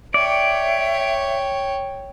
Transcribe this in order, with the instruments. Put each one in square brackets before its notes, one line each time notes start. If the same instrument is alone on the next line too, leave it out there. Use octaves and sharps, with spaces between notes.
[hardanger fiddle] C#5 G5 [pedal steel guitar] D5 [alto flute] E5